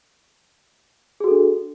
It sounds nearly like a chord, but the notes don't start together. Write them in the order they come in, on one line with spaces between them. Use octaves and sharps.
G#4 F#4 A4 D4